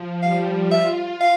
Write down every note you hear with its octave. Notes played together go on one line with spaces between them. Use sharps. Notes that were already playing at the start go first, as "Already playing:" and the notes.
Already playing: F3
G3 F5
F4 E5
F5